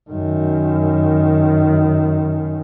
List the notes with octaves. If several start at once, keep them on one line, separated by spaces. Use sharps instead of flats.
F#2 D#3